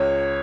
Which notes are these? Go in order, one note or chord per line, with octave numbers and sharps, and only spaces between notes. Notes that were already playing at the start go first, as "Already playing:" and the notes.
Already playing: C#2 C#5